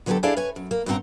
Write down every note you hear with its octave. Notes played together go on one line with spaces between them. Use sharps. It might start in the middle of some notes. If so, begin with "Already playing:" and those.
D3 F#3 B3 F#4 G4 A4
D4 E4 G#4 A4 D5 F5
B4 C#5 G#5
F#2
A#3
G2 A#2 C#3 C4 F#5 A#5